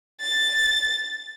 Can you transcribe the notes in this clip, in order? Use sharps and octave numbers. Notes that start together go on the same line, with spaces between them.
A6